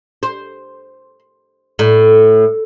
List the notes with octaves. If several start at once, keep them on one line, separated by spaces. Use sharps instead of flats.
C5
A2